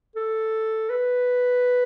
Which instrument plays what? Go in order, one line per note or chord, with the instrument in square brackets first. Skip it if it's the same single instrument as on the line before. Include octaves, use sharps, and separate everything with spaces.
[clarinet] A4
B4